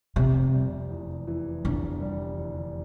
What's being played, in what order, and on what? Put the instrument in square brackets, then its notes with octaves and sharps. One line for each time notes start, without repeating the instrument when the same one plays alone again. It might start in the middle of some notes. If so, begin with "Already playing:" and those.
[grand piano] F1 [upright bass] C3
[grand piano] G3
E2
E3
[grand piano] F1 [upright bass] D3
[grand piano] G3
E2